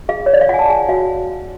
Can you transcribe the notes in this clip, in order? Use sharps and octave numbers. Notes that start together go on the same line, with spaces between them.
G#4 F5
B4 C#5
D5
F5
F4 F#5
G#5
A5
G#4 G#5
F#5
F#4 F5